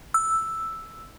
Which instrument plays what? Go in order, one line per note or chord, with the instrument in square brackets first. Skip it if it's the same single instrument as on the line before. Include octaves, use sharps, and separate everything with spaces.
[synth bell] E6